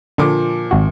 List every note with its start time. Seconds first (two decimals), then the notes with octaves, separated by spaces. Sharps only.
0.18 A#2 D3 F3 D6
0.71 G#1 F#4